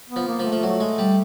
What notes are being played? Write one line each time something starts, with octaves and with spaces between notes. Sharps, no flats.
B3
F3
A#3
F3
A3
F3
F#3
G#3
G3